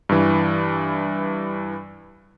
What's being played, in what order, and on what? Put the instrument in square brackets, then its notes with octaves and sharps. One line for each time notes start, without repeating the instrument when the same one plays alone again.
[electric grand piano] G2 E3